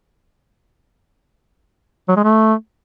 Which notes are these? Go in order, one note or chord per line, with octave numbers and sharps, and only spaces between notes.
F#3
G#3
A3